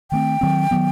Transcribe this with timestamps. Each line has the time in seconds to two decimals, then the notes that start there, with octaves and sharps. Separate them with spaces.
0.11 D#3 A3 C4 G5
0.41 D#3 F#3 C4
0.71 D#3 F#3 B3